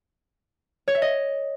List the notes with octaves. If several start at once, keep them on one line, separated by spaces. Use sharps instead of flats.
C#5
E5
D#5